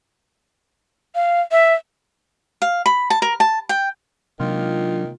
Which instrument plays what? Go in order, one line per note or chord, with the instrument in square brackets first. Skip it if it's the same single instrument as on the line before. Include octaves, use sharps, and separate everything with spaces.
[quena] F5
E5
[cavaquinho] F5
B5
A5
A#4
A5
G5
[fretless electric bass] C3 G#3 A#3 [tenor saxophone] D#3 [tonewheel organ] F#3 D4 [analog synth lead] F4